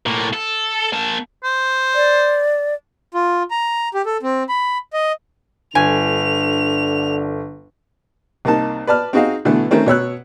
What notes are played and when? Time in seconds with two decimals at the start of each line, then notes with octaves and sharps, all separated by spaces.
0.06 A2 A#3
0.33 A4
0.93 A#3 A5
1.44 C5
1.95 D5
3.14 F4
3.51 A#5
3.94 G4
4.06 A4
4.23 C4
4.49 B5
4.93 D#5
5.75 G1 D3 G#5 F7
8.45 C2 A#3 D#4 A5
8.87 B4 D5 A5 F6
9.13 C4 D#4 F#4 G#4 D#5 F5
9.45 B2 D3 E3 A3 B3
9.71 D#3 A3 C4 C#4
9.86 B2 C#5 E6 F#6